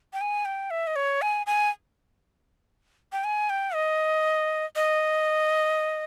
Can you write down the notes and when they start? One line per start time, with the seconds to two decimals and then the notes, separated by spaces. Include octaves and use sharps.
0.13 G5
0.21 G#5
0.45 G5
0.71 E5
0.87 D#5
0.96 C#5
1.22 G#5
1.47 G#5
3.12 G5
3.24 G#5
3.50 G5
3.74 D#5
4.76 D#5